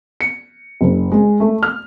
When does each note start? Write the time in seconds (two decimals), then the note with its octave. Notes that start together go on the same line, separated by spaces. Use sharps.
0.21 C#7
0.81 F#1
1.12 G#3
1.40 A3
1.63 F6